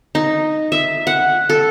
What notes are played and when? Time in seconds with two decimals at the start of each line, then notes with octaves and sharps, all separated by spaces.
0.15 D#4
0.72 E5
1.07 F#5
1.50 A4